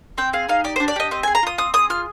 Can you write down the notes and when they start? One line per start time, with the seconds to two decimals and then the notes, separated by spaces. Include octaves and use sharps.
0.18 C4 G5
0.33 G#4 F5
0.49 D#4 F5
0.64 G4 D5
0.76 C5
0.80 D4
0.88 D5
0.96 G4 D#5
1.11 C4 D#5
1.23 G#5
1.27 G#4
1.35 A#5
1.43 F4 D#6
1.58 C4 D#6
1.74 G#4 D#6
1.90 F4 F6